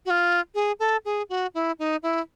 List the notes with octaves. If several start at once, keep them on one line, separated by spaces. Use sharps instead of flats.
F#4
F4
G#4
A4
G#4
F#4
E4
D#4
E4